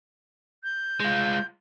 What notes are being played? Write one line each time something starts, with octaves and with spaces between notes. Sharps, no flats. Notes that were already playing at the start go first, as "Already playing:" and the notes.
G6
G#3 F4